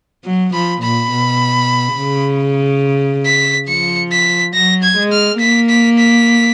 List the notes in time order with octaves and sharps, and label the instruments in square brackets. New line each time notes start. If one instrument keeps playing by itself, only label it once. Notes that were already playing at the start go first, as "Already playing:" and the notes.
[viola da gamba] F#3
[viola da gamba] F3 [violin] B5
[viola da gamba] A#2 [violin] B5
[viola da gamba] B2
C#3
[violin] B6
[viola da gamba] F3 [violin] C#7
[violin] B6
[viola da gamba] F#3 [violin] A#6
[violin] G#6
[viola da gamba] G#3
[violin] F6
[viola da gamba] A#3 [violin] B6
[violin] B6
B6